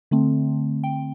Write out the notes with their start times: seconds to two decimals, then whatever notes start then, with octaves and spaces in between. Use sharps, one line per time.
0.11 D3 A3 C4
0.84 G5